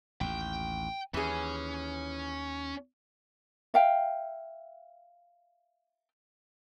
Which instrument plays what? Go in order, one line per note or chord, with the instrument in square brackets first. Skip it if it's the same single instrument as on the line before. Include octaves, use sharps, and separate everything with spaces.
[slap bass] A1 D#2 [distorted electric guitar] G5
[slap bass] D#2 [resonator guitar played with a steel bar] E3 G#4 [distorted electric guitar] C#4
[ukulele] E5 F5 G5